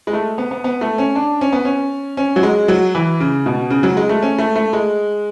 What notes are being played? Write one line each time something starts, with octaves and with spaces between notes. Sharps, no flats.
G#3
A3
B3
B3
B3
A3
C#4
D4
C#4
B3
C#4
C#4
F#3
G#3
F#3
E3
C#3
B2
C#3
F#3
G#3
A3
C#4
A3
A3
G#3